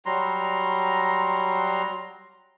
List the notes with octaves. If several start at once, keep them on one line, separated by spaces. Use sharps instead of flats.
F#3 G3 A#5 C6